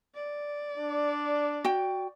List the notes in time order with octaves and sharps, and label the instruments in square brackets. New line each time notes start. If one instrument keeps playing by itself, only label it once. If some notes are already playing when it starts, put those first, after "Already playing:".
[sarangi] D5
[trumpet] D4
[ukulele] F#4 G5